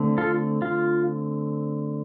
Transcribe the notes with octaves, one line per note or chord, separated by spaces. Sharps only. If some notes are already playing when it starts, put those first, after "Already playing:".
Already playing: D3 A3 C4
F4 A4
F4